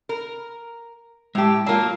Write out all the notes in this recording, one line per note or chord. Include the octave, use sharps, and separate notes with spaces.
A#4
A2 G#3 G4 A5
F#3 A#3 F4 A#4 A5